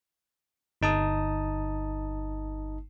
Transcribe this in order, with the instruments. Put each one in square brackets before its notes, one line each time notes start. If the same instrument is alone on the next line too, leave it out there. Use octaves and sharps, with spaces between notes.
[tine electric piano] G1 D#4 A5 D#6